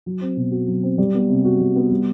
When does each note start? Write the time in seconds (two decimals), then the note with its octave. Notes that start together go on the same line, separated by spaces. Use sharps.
0.06 F#3
0.21 C4
0.37 B2
0.52 F#4
0.68 F#3
0.83 C4
0.98 G3
1.14 B3
1.29 C3
1.45 F#4
1.60 G3
1.76 B3
1.91 G3